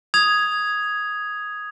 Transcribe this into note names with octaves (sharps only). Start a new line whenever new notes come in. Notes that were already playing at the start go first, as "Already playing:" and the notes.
D#6 G#6 F7